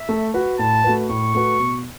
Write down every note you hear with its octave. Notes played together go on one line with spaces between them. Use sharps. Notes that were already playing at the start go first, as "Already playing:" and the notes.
Already playing: E5
A3
F#4 B4
A2 A5
A3 F#4 B4
A2 C#6
A3 F#4 B4
B2